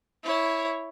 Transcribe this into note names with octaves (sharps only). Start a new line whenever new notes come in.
E4 C#5